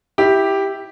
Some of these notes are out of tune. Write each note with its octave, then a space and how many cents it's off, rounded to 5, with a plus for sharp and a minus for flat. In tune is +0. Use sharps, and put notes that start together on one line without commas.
E4 -5 G4 +0